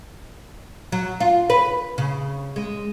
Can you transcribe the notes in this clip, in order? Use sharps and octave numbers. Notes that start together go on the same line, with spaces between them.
F#3
F4
B4
C#3
G#3